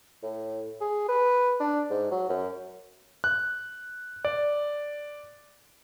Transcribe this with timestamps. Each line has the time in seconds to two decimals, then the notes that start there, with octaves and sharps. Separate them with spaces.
0.23 A2
0.81 G#4
1.09 B4
1.60 D4
1.90 G#2
2.11 F#3
2.30 F#2
3.24 F#6
4.25 D5